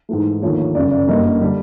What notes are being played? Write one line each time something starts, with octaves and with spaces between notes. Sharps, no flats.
G#2 E3 A3
D#2 D3 F3 A3 C#5
C#5
G1 F#2 C#3 D5
D5
G1 F#2 D3 G3 A#3 D#5
D3 G3